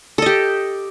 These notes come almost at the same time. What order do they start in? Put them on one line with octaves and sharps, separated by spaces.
A4 D#5 G4